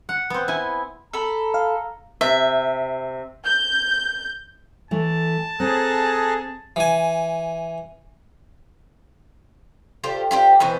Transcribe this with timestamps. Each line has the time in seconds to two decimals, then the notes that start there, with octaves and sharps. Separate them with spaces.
0.09 F#5
0.30 B3 C4
0.48 E4 G#5
1.13 A4 A#5 B5
1.54 F5
2.21 C3 E5
3.44 G6
4.91 E3 A3 A5
5.60 C4 G#4 A4 A#5 F#6
6.76 E3 G#5
10.04 F4 G4 A4 C5
10.31 F4 G4 C5
10.60 B2 E3 B3 C5